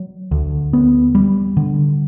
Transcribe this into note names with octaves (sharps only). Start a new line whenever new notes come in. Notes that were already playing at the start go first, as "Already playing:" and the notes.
Already playing: F#3
D2
B3
G3
D3